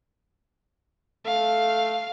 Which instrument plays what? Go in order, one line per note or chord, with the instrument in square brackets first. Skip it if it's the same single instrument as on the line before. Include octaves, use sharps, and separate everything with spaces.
[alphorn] A3 [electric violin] F5